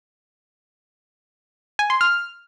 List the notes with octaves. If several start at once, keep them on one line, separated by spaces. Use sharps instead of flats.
G#5
C6
F6